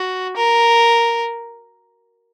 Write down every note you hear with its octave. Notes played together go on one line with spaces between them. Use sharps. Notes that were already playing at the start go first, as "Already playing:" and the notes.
Already playing: F#4
A#4